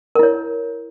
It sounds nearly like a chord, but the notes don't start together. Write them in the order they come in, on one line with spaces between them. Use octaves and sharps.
A#4 E4 C#5